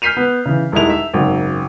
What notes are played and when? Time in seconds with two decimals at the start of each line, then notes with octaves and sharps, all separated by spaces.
0.02 F6 G6 B6 C7 D#7 F7
0.17 B3
0.45 C#3 E3
0.72 D#1 D#3 G#3 E4 F7
0.90 E5
1.14 G#1 F#2 C#3